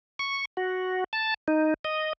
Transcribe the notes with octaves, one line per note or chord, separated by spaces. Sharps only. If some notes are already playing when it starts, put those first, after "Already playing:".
C#6
F#4
A5
D#4
D#5